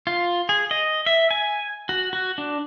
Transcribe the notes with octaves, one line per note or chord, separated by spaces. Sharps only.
F4
G#4
D#5
E5
G#5
F#4
F#4
D4